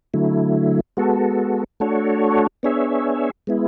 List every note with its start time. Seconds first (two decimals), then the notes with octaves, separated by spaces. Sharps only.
0.14 D3 F#3 A3 E4
0.97 G#3 B3 F#4 A4
1.80 A3 D4 F#4 A4 C#5
2.63 B3 D4 G#4 C#5 E5
3.47 G#3 B3 E4